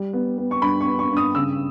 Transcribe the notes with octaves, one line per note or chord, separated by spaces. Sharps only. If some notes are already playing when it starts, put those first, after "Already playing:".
Already playing: G3
B3
B3
C#6
G2 B5
C#6
B3
C#6
G2
D#6
C#3 E6